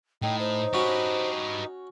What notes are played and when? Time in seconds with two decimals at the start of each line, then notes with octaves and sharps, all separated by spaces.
0.22 A2 D#4 G5
0.39 C5
0.74 C#4 F#4 G4 B4